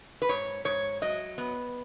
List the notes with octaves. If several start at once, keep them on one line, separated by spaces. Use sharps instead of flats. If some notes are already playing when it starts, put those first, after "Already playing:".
B4
G#2 C#5
G#2 C#5
F#3 D#5
B3